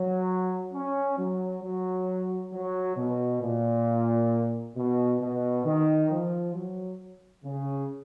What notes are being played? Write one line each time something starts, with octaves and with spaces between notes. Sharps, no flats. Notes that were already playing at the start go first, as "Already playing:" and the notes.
Already playing: F#3
C#4
F#3
F#3
F#3
B2
A#2
B2
B2
D#3
F3
F#3
C#3